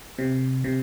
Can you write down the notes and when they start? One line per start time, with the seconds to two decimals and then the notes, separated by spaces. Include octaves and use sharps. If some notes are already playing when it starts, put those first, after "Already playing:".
0.18 C3
0.64 C3